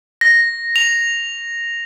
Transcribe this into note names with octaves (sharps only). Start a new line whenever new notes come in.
A#6
F7